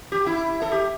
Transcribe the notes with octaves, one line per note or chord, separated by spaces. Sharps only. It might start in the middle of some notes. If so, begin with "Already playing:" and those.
G4
E4
A4
G4